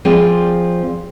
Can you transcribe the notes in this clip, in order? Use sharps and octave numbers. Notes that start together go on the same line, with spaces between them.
F3 C4 G#4 D5